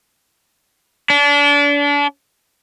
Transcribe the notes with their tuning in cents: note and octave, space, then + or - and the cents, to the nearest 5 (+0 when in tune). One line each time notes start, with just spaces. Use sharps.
D4 -35